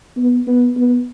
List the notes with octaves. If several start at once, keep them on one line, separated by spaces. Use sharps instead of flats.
B3
B3
B3